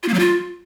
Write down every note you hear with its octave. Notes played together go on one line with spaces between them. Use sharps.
F4
A#3
F#3
F4